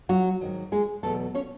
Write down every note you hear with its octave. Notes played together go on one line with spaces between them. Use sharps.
F#3 F#4
G#2 D#3 F#3
G#3 G#4
E2 B2 F#3 A3 A4
C#4 C#5